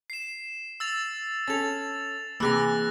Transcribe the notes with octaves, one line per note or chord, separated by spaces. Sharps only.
C7 E7
E6 A6 F7
C#4 A4 A6 F7
C3 E3 A#3 G#4 E6 F#6 A#6